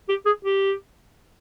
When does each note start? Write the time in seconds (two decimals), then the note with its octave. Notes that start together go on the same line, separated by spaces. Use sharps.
0.09 G4
0.26 G#4
0.45 G4